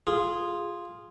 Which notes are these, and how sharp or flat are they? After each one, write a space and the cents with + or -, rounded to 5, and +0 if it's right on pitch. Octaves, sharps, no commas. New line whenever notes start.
F4 +0 G#4 -10